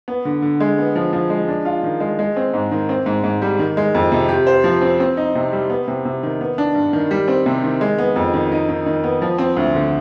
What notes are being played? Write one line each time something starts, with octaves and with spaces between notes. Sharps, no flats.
B3
D3
D3
G#3
B3
F3
F3
G#3
D4
F4
D#3
G#3
G#3
C4
G#2
D#3
C4
G#2
G#2
G3
D#3
G#3
F2
C3
G4
C5
F3
C4
C4
D#4
C3
G3
B3
C3
C3
D#3
B3
D4
G2
D#3
G3
C4
C3
D#3
G#3
B3
F2
D#3
D#4
D#3
D#3
B3
F3
C4
D2
D3